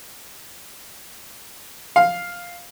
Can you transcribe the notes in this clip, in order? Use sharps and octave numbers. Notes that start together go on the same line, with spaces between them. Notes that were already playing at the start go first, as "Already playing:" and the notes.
F5